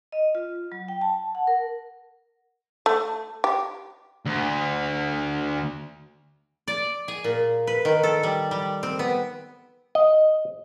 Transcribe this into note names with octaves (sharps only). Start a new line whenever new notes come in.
D#5
F4
F#3
G5
A5
F#5
A#4
A3
G4
D2
D5
G#4
A#2
B4
D#3
A4
G3
G3
C4
B3
D#5